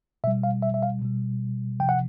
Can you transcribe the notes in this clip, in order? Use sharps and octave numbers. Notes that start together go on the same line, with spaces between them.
B2 G3 E5
F5
E5
E5
F5
B2 G3
C3 F3 G5
F#5